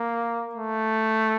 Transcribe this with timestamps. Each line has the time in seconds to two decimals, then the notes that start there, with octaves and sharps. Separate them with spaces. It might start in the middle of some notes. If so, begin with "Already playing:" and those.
Already playing: A#3
0.55 A3